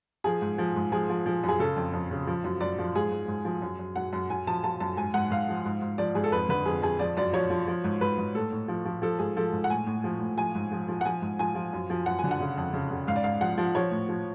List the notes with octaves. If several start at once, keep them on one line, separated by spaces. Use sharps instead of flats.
F3 G#4
G#2
F3
G#2
F3 G#4
F3
F3
F#2 G#4
C#3 A4
F2
F2
C#3
F3
F#2
F#2 D5
F3
G#2 G#4
G#2
G#2
F3
F#2
F#2
F#2 F#5
F#2
F#2 G#5
F3 A5
F3 A5
F#2 A5
G#2 G#5
G#2 F#5
G#2 F5
F3
G#2
G#2
F3 D5
G#2 G#4
A4
F2 B4
D3 B4
F2 G#4
F2 G#4
F3 D5
F#2 D5
F3 C#5
F3
F3
G#2
G#2 B4
G#2
A2 A4
A2
F3
F3
F3 A4
G#2 G#4
F3 A4
G#2
F#5
A2 G#5
A2
F3
A2
F3 G#5
G#2
F3
F3
F#5
F3 G#5
G#2
F3 G#5
F3
F#2
F3
F#2 F#5
G#5
D3
F#5
C#3
F2
C#3
C#3
G#2 F5
D5
G#2 F5
F3 F#5
F3
F3 C#5
A2
F3